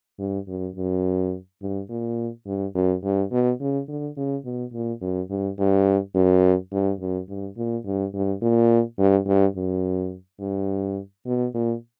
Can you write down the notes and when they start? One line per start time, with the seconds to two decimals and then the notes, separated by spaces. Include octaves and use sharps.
0.19 G2
0.48 F#2
0.76 F#2
1.62 G2
1.89 A#2
2.46 G2
2.75 F#2
3.03 G2
3.32 B2
3.60 C#3
3.88 D3
4.17 C#3
4.45 B2
4.73 A#2
5.01 F#2
5.30 G2
5.58 G2
6.15 F#2
6.72 G2
7.00 F#2
7.29 G2
7.57 A#2
7.85 G2
8.14 G2
8.42 A#2
8.99 G2
9.27 G2
9.56 F#2
10.40 G2
11.26 B2
11.54 A#2